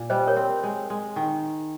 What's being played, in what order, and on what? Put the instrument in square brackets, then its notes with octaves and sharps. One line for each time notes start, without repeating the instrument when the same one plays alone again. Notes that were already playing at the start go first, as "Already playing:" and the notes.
Already playing: [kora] A#2
[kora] G3 [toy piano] C5 D#5
[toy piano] A#4 C#5
[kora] C4
G#3
G#3
D#3